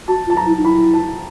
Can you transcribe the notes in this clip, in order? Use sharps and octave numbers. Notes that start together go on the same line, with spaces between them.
F#4 A5
F4
A5
A#5
E4
D#4
E4 B5
A5